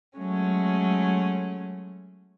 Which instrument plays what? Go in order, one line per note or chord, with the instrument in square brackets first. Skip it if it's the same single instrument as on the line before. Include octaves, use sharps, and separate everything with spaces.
[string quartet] F#3 G#3 A3 C#4